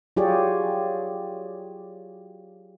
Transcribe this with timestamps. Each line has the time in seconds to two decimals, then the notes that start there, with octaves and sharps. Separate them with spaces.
0.17 F#3 F4 G4 G#4 C#5 D5